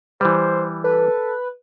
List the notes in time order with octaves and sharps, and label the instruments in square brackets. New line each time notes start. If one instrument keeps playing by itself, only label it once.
[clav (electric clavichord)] E3 G3 [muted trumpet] C5
[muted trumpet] A4 [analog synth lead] B4